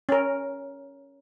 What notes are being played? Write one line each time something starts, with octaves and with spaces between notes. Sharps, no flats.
C#4 A#4